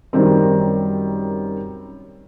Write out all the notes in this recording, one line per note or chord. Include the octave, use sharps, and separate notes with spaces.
F#2 D#3 G3 C4